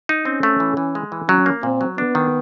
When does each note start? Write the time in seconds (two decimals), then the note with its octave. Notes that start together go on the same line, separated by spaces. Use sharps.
0.09 D#4
0.25 C4 C#4
0.43 A3
0.60 E3
0.77 E3
0.95 G#3
1.12 E3
1.29 F#3 C#4
1.46 A#3
1.63 A#2 C4
1.81 F#3
1.98 B3 D4
2.15 D#3